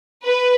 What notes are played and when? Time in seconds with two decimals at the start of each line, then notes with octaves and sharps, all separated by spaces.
0.23 B4